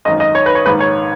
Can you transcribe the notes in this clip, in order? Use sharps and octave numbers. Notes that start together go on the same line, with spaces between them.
G#1 F#2 D#3 D#5
D#5
C#5
B4
C#5
A#1 G#2 D#3 B4
C#5